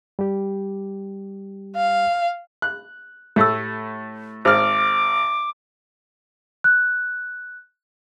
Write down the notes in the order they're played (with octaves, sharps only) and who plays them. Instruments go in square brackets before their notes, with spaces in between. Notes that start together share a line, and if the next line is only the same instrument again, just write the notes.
[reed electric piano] G3 G4
[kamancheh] F5
[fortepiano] F#6
[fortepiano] A2 A3 [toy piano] G4 E6
[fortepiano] G#1 F6 [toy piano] C5 [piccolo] D6
[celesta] F#6